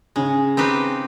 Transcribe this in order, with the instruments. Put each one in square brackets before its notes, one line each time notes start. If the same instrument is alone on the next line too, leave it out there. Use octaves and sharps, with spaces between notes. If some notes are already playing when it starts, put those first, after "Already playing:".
[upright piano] C#3 [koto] G#3
[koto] C4 D#4 G4 B4